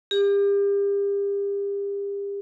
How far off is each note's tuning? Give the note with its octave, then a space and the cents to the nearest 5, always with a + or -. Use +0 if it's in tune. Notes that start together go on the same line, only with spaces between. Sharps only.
G4 +35